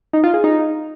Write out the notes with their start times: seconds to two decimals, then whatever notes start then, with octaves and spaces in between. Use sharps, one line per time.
0.13 D#4
0.24 F4
0.34 G#4
0.44 D#4